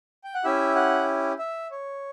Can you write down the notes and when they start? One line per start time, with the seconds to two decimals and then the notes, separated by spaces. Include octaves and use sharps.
0.24 G5
0.34 F#5
0.44 C#4 E4 G4 E5
0.75 F#5
1.39 E5
1.71 C#5